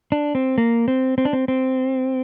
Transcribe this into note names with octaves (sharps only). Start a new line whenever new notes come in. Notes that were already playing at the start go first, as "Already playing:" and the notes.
D4
C4
A#3
C4
C4
D4
C4
C4